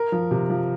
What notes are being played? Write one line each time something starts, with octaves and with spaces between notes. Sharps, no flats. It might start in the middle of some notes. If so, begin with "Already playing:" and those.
Already playing: A#4
F3
C3
F3